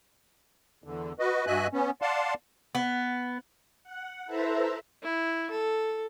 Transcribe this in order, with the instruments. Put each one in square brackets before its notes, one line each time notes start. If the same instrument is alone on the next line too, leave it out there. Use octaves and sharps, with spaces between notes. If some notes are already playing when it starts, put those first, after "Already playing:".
[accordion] E2 D3
F#4 B4 D#5
G2 F#4 D#5 E5 G#5 F#6
B3 C#4
D5 F5 F#5 A5 C6
[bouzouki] B3
[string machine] F#5
E4 A4 B4 C5 E5 A#5
[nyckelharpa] E4
A4